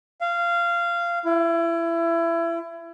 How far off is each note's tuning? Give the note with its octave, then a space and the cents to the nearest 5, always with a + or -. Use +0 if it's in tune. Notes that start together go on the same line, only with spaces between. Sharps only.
F5 -20
E4 +25